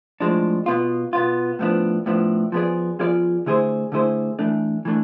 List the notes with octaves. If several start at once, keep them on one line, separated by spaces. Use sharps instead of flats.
A2 F3 G#3 D4
B2 B3 F4
B2 B3 F4
A2 F3 B3 D4
A2 F3 B3 D4
F3 B3 F4 G#4 D5
F3 B3 F4 G#4 D5
D3 A3 E4 G#4 C5
D3 A3 E4 G#4 C5
E3 A3 D4
E3 A3 D4